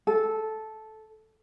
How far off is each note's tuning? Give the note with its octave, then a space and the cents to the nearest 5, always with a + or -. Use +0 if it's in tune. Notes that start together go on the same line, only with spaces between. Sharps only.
A4 -10